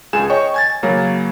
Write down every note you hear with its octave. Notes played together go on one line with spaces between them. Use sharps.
C#2 G#4 G#5 E7
C#5 D#5 G5 C#6
G#5 G#6 A6
C#3 F#3 A#3 C#4